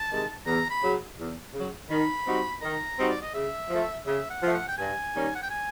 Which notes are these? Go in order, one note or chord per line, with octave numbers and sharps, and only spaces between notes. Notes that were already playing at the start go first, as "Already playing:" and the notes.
Already playing: A5
C3 D#3 G#3
E2 A#5
B5
C#3 F#3
E2
C#3 F#3
D#3 B5
G3 C4 D#4 F#4
D#3 A#5
G3 C4 D#4 F#4
D5
D#5
C#3 E5
F3 A3
C#3 E5
F#5
F3 A3
F#5
G5
G2 G#5
D#3 G3 A#3 C#4
F#5
G5
G#5